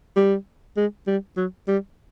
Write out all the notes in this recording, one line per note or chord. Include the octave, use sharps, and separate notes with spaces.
G3
G#3
G3
F#3
G3